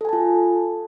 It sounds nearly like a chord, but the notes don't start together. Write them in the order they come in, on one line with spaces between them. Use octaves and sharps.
A4 G#5 A5 F4